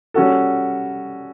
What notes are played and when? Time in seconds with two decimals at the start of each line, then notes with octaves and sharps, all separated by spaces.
0.14 G3 C#4 F#4 A4